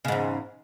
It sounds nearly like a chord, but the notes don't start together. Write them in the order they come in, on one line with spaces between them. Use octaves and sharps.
C#3 G#2 E2